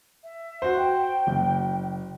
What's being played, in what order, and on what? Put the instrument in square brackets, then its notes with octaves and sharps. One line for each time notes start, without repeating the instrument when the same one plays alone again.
[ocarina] E5
[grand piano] F#4 C5
[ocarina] G5
[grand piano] F#1